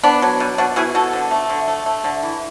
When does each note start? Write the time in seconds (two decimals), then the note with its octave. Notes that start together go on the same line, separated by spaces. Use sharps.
0.03 B3 D4
0.22 F#3
0.40 B2
0.58 B2 D4 F#4
0.76 B2 E4 G#4
0.95 B2 F#4 A4
1.13 D3
1.31 A3
1.49 D3
1.68 A3
1.86 A3
2.04 D3
2.23 E3